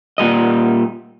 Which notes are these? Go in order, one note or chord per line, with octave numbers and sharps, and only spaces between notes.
A#2 G3 D#5